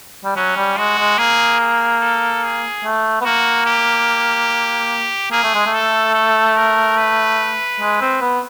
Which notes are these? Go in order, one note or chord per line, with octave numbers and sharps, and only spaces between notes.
G3
F#3 C#4
G3
G#3 F#4
G#3
A#3 G#4
G#4
A4
G#4
A3
B3
A#3 F#4
G4
A#3 G#4
A3
G#3
A3
A4
A4
A#4
B4
G#3
C4
B3